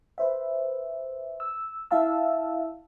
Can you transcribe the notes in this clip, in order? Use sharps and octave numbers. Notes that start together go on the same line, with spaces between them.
B4 C5 E5
E6
E4 E5 F5 A5 E6